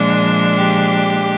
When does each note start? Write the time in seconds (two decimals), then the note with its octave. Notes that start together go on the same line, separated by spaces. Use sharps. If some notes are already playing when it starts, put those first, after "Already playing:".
Already playing: A#2 F3 G#3 D4
0.58 G4